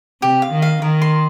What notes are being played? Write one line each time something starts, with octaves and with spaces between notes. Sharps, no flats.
C3 G4
F5
D#3
F5
D#3 A#4
C6